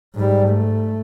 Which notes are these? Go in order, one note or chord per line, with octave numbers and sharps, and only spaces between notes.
G#2 G3
A3